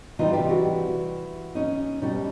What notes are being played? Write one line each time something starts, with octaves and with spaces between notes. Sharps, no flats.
C3 E3 G3 D#4 F4
F4 G4
E4 F#4
C#4 D#4
B2 G3 C#4 D#4